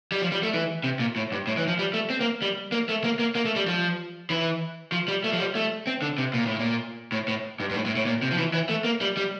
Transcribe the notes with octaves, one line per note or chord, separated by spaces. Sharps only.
G3
F3
G3
A3
E3
C3
A#2
A2
G2
A2
E3
F3
G3
A3
C4
A#3
G3
A#3
A3
A#3
A#3
A#3
A3
G3
F3
E3
F3
G3
A3
F3
G3
A3
C4
D3
C3
A#2
A2
A#2
A2
A2
G2
G2
A2
A2
A2
A#2
C3
F3
E3
E3
A3
A#3
G3
G3